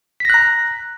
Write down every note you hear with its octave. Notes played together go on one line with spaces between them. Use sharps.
A#5 F#6 A#6 B6